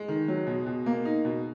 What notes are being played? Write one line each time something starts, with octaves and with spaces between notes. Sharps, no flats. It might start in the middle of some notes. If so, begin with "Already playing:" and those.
Already playing: G#3
D#3
F#3
B2
B2
A#3
D#4
B2